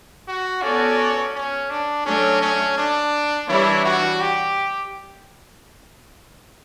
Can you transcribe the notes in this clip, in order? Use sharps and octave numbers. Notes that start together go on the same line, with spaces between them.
F#4
B3 C#4 F#4 A4 D5
C#4
D4
F#3 A3 C#4 D4
C#4
D4
E3 G3 D4 E4 G4 C#5
F#4
G4